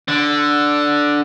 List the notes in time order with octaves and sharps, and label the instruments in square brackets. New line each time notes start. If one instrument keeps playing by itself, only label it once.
[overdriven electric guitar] D3